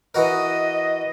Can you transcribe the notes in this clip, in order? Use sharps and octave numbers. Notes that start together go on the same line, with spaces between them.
E3 F#4 A#4 D#5